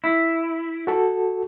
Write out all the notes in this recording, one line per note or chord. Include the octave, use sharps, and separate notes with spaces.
E4
F#4 A4